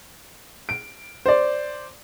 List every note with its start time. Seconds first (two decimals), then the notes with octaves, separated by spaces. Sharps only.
0.69 D7
1.26 C5 D5